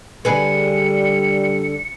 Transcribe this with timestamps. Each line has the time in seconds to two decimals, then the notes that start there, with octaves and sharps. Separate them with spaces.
0.25 D3 G3 G#4 B4 C#7